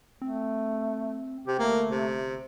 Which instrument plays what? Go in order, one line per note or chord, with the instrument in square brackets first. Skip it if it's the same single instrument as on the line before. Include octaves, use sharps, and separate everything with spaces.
[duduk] A3 [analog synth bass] C4
[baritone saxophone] C3 [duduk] G4
[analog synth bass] G1 [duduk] A3 [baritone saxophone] A#3
[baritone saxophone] C3